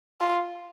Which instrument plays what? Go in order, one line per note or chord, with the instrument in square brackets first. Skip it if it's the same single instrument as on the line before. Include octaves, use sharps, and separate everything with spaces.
[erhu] F4